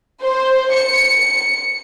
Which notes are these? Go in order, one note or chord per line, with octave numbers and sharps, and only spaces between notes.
C5
C#7